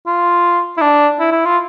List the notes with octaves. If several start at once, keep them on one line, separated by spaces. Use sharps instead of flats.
F4
E4
D4
E4
E4
F4